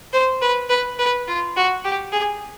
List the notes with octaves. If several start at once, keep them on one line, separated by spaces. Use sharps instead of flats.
C5
B4
B4
B4
F4
F#4
G4
G#4